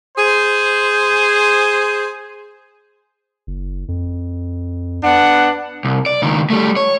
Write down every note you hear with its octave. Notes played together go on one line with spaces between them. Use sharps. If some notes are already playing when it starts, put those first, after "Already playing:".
G#4 C5
F#1
F2
B3 D4 F#5
C2
D5
C#2 D#3
G3 A3
C#5